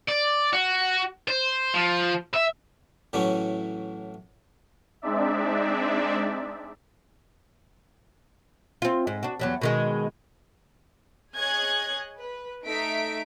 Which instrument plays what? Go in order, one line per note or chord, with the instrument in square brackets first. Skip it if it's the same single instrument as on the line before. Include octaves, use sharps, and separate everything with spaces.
[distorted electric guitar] D5
F#4
C5
F3
E5
[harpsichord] A2 E3 F#3 C#4
[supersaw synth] G#3 C4 D4 D#4 D5 E5
[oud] C4 F4
G#2
D4 F#4
E2 F#3 G3
B2 D#3 G#3
[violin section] G#4 C#5 D#5 G#5 F#6 G#6
B4
A3 D#4 E5 B6 D7